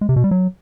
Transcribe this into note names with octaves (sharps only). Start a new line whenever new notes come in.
G#3
C3
B2
G3
F#3